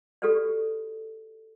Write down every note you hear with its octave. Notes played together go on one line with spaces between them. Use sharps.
F#4 G4 A4 B4 D5